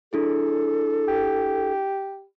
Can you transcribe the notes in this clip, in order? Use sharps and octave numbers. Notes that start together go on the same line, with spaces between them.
D4 E4 G#4 A4
G4